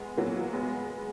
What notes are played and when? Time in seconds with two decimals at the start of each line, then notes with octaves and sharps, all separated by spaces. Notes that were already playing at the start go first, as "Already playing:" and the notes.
Already playing: G#3 B3
0.17 F#3 A#3
0.53 G#3 B3